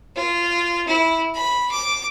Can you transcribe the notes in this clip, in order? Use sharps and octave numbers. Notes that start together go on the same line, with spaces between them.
F4
E4
B5
D6